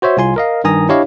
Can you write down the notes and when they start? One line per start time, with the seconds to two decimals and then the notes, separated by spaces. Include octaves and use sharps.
0.02 F#4 C5 C#5 E5
0.17 C2 F4 G#5 C6
0.36 A#4 D#5 F5
0.64 G2 D#3 G#5 A#5 D#6
0.89 D4 E4 G4 C#5 D#5 F5